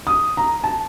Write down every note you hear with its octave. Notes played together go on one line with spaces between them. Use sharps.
D#6
A#5
A5